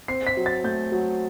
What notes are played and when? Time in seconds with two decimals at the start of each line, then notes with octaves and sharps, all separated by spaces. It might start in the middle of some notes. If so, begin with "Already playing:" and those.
0.08 C4 C7
0.27 B6
0.37 F#3
0.46 A6
0.64 A3 G6
0.92 F#3